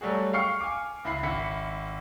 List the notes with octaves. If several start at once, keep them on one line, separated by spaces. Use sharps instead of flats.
F#3 G3 A3 F#4 G#4
F5 G5 C#6 F6 C7 C#7
G#5 D6
C#2 E4 B5 C7
G#1 E4 B6 C#7